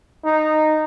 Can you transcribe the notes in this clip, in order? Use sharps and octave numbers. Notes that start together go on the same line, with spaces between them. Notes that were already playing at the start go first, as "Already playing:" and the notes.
D#4